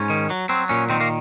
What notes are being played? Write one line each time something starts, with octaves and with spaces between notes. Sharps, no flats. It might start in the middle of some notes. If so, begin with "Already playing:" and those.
Already playing: G#2 C#4
D#3
F#3
F#3 C4
A#2 C#4
D#3 C4
A#3